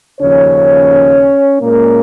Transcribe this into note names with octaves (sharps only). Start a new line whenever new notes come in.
D#2 C#3 F3 C#4 C#5
A#2 G#3 A#3 C#4 A#4